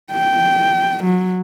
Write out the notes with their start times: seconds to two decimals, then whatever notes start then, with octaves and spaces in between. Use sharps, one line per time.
0.12 G5
1.05 F#3